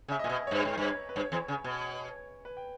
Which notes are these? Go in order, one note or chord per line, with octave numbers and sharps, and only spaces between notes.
C#3
E5
A#2 D#5
B2
C#5
G2 B4
G#2
G2
C#5
B4
G2 C#5
E2
C#3
B2
B4
G5